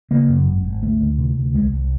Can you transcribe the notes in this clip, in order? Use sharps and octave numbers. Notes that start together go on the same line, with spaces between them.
C#3 A#3
F#2
G#1
G#1
D2 A3
D2
C3
D2
C2 G#3
C2